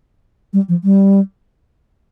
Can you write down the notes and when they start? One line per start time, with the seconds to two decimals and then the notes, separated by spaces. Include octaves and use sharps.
0.53 G3
0.69 F3
0.84 G3